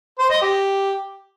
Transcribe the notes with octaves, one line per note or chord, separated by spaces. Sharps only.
C5
D#5
G4